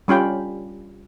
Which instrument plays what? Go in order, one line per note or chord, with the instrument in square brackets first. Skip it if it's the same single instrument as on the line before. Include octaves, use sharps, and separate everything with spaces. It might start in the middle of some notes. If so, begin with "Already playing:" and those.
[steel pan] G3 C#4 F4 G5 B5